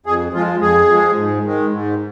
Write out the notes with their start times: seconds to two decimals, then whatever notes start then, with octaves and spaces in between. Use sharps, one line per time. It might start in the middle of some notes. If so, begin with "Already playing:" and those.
0.06 F2 G#4
0.34 F3 G#3 F4
0.61 F2 G#4
0.89 F3 G#3
1.17 G#2
1.45 D#3 G#3
1.73 G#2